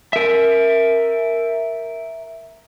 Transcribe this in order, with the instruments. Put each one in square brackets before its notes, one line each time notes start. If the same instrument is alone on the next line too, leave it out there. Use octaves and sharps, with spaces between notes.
[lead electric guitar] A#4 E5